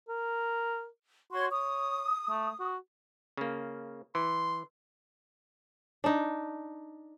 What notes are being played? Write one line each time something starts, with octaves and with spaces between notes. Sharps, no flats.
A#4
F#4 C#5 C6
C#5 D#6
A3
F#4
C#3 A#3
E3 C6
D4 D#4